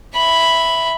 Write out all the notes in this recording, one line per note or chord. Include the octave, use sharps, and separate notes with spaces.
E5 B5